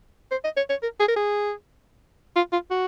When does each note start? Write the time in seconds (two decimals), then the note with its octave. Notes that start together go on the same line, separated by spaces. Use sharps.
0.31 C5
0.44 D#5
0.57 C#5
0.70 C#5
0.83 A#4
1.00 G#4
1.08 A#4
1.16 G#4
2.36 F4
2.53 F4
2.71 F#4